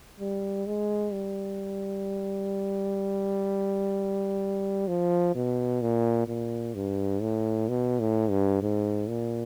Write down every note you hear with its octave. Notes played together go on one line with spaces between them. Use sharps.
G3
G#3
G3
F3
B2
A#2
A#2
G2
A2
B2
A2
G2
G#2
A#2